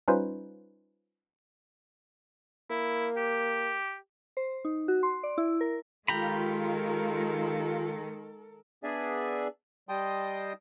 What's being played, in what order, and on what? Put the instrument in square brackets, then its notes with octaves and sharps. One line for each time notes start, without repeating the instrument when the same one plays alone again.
[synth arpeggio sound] G3 C#4 D#4 F4 B4 C5
[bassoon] A#3 [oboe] E4
[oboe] G4
[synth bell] C5
D#4
F#4
C6
D5
E4
A#4
[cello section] D#3 G#3 [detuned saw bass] F4 [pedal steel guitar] G4 A#5 B5 [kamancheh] A4 A#4
[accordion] B3 D4 G#4 D5 E5 G#5
G3 D#5 G5 A5 C6 D#6